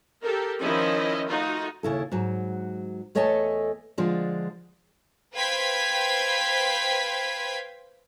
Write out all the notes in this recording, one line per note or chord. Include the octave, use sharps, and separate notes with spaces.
G4 A4 A#4
D#3 F3 C#4 E4 D#5
A3 D#4 F4 F#4
D#2 C#3 E4 A4
G#2 F#3
E2 A3 C#5 D#5 G#5 A5
D3 F3 G#3 D4
B4 C5 F5 G5 G#6 B6